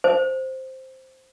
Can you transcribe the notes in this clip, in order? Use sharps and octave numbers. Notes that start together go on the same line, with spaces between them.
C5